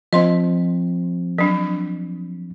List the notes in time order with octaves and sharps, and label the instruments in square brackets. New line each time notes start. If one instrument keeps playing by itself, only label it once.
[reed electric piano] F3 C4 [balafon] D#5 C6
[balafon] F#3 D4